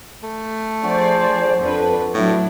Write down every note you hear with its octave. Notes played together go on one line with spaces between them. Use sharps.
A3
F3 D4 F#4 G#4 C5 D5
F2 D4 A4 B4
A2 F#3 D4 E4